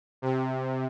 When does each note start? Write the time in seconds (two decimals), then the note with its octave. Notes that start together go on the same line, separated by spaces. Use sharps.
0.22 C3